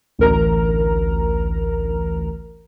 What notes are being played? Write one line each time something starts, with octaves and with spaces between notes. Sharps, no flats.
A1 D2 A#4 A#5